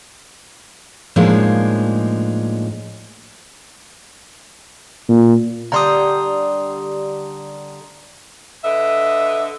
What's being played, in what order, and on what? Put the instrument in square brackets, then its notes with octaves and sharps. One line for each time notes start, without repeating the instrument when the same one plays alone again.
[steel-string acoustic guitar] A2 F3 G#3 A#3 D4 D#4
[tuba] A#2
[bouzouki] D3 G3 [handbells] A#5 C6 D#6
[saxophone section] D3 B4 D#5 E5